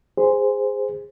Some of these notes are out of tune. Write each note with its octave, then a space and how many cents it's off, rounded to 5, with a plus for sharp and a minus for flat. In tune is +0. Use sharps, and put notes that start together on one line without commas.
G#4 -15 C5 -10